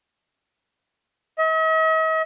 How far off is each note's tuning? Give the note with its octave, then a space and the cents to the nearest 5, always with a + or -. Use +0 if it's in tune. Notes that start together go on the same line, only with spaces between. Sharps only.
D#5 +45